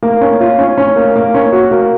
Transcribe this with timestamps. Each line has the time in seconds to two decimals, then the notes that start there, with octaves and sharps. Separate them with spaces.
0.03 A#3
0.21 C#4
0.41 F4
0.59 C#4
0.78 C#4
0.96 A#3
1.16 A#3
1.34 C#4
1.53 F#4
1.71 A#3